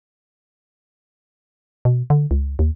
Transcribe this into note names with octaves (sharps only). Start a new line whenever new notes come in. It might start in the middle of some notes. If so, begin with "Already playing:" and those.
B2
D3
C#2
D#2